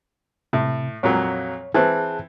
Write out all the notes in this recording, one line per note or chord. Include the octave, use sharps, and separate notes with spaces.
A2 C3
F2 A#2 F#3 C#5
E3 C4 G#4 A5 F#6